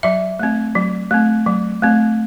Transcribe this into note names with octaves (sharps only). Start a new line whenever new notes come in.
F#3 E5
A3 C4
F#3
A3 C4
F#3
A3 C4